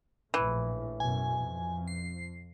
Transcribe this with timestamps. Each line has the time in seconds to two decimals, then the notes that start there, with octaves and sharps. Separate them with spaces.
0.34 A#1 A2 E3
1.00 F#2 B2 G#5
1.39 F2
1.88 C7